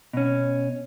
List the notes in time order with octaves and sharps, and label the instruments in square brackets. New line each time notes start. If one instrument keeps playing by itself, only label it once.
[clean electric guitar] B2 C#4